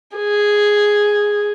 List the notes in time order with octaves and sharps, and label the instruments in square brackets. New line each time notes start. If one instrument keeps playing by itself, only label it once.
[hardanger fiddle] G#4